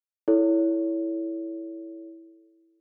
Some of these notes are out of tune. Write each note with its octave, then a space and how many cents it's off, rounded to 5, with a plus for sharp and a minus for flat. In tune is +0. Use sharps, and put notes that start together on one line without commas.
E4 +0 A4 +0 C#5 +20